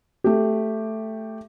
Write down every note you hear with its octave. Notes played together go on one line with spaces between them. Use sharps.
A3 G4